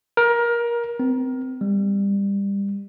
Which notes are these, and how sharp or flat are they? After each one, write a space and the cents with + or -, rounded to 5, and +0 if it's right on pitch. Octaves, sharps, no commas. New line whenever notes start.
A#4 +20
C4 -30
G3 +25